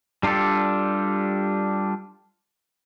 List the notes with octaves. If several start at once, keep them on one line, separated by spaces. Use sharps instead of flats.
G3 D4 F4 G4 A4